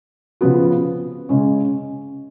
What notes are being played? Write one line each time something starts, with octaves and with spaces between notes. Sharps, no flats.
C#3 F3 B3 F#4
C#3 G#3 C#4